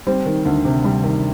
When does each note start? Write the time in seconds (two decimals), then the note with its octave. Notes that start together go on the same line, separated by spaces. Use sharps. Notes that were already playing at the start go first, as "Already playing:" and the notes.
0.07 G3 C4
0.26 D#3
0.45 D2
0.65 C3
0.84 G3
1.04 D#3